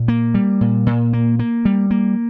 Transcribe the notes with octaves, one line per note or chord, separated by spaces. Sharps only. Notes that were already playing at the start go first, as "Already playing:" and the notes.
Already playing: A#2
A#3
G3
A#2
A#2
A#3
A#3
G3
A#3